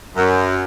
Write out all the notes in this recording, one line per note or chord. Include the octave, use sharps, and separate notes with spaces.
F#2